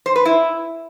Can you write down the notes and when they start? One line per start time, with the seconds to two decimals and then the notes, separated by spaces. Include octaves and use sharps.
0.06 C5
0.16 B4
0.25 E4